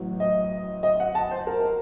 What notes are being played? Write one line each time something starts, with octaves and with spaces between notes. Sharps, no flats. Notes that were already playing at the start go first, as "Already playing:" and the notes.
Already playing: A1 A2 F#3
D#5
D#5
F#5
A5
C5
A#4